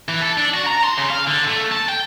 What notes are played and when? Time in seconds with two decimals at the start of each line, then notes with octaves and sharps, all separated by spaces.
0.09 E3
0.22 A4
0.37 D4
0.54 F#4
0.66 A#5
0.84 C6
0.98 C#3
1.10 F5
1.27 D3
1.48 A3
1.72 A5
1.89 G5